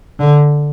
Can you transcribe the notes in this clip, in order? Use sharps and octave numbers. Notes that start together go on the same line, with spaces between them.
D3